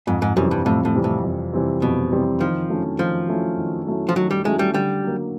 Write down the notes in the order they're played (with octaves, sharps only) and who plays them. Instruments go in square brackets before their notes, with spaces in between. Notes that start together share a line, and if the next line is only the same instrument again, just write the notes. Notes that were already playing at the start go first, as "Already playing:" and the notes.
[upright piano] F2 [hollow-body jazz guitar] G#2
[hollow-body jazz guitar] G#2
[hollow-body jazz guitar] F#2 [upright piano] C3 E3 G3 C4
[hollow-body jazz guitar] G2
[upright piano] F2 [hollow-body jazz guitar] A2
[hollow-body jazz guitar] A2
[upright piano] C3 E3 G3 C4
[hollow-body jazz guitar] A2
[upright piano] F2
C3 E3 G3 C4
[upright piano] F2 [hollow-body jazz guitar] B2
[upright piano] C3 E3 G3 C4
[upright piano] D#3 [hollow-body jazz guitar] F3
[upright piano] F#3 A3 C#4 E4
[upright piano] D#3 [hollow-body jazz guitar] F3
[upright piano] F#3 A3 C#4 E4
D#3
F#3 A3 C#4 E4
[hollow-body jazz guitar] F3
[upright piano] D#3 [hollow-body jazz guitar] F#3
[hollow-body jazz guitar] G3
[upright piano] F#3 A3 C#4 E4 [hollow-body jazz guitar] G#3
[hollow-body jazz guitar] G3
[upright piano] D3 [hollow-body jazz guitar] G3
[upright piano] F#3 A#3